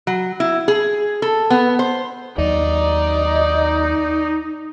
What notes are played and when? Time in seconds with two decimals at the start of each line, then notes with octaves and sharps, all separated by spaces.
0.07 F#3
0.40 E4
0.68 G#4
1.22 A4
1.50 B3
1.79 C5
2.38 D#2 F#3 D#4 D5